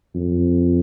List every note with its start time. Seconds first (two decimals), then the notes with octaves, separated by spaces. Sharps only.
0.15 F2